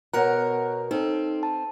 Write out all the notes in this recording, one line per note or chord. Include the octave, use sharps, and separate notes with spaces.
B2 A#4 C#5 F#5 A#5
C4 D#4 A4
A5